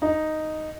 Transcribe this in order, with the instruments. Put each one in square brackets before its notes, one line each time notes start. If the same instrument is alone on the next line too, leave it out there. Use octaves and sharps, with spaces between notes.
[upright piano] D#4